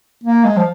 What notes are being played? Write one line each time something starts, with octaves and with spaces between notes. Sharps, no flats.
A#3
G#3
F3